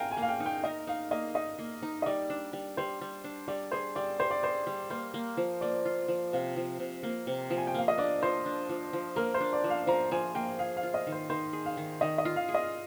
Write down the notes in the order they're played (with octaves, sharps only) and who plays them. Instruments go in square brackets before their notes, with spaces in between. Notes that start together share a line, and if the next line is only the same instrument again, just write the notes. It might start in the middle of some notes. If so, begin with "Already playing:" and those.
Already playing: [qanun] A#4 [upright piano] F5 G5 G#5
[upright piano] G#5
[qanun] A#3 [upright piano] F5
[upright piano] G5
[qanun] D#4
[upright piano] G5
[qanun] A#4 [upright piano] D#5
[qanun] D#4 [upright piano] F5
[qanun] A#3 [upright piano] D#5
[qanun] D#4 [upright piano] D#5
[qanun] A#3
D#4
[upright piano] D#5
[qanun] G3 [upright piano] D5
[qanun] D4
G3
[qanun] G3 [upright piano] C5
[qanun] G3
D4
[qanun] G3 [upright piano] D5
[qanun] G#4 [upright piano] C5
[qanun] G3 [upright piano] D5
[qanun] G3 [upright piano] C5
[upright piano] D5
[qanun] G#4 [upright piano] C5
[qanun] G3
[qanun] A#3 [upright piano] C5
[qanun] A#3
F3
[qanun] A#3 [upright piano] D5
[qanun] F4
F3
[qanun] C3 [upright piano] F5
[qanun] F3
C3
A#3
C3
F3
[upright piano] G#5
G5
[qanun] A#3 [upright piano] F5
[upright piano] D#5
[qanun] D4 [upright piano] D5
[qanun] F3 [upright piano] C5
[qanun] D4
F3
F3
[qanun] A#3 [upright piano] A#4
[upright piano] C5
[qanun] D4
[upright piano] D5
[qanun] F3
[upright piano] F5
[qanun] F3 [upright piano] A#5
[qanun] F3 [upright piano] G#5
[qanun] A#3 [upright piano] G5
[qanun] G#4 [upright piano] F5
[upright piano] F5
[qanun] F4
[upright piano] D#5
[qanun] D#3
[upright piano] C5
[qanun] D#3 [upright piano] C5
[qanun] G#4
[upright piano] F5
[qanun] D#3
[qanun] D#3 [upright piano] D#5
[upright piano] D#5
[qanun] F4
[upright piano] F5
[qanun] G#4
[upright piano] D#5